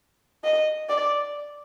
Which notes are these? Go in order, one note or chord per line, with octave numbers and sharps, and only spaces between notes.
D#5
D5